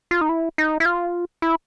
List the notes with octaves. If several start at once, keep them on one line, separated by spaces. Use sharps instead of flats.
F4
D#4
E4
D#4
E4
F4
E4